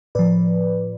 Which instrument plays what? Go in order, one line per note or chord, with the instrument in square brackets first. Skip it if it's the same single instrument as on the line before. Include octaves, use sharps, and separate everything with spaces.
[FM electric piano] A2 F3 B4 D5